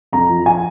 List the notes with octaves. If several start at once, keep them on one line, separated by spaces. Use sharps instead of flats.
F2 A#5
F3
G#5